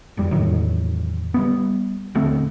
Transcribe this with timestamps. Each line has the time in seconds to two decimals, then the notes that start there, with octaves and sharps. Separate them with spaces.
0.17 F#1 F2 G3
0.31 E2 A2 D#3 F#3
1.34 G3 A3 B3
2.15 D#1 D2 A3 C4